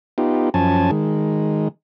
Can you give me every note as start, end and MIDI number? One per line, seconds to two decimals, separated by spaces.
0.18 0.49 59
0.18 0.49 63
0.18 0.49 65
0.18 0.49 67
0.54 0.91 42
0.54 0.91 53
0.54 0.91 61
0.54 0.91 80
0.54 0.91 81
0.91 1.68 51
0.91 1.68 56